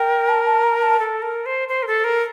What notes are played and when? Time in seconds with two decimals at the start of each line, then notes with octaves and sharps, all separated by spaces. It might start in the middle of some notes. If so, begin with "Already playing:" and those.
Already playing: A#4 G5
0.29 A5
0.46 A5
0.63 A#5
0.82 A5
0.99 A4
1.22 A#4
1.46 C5
1.69 C5
1.83 A#4
1.87 A4
2.04 A#4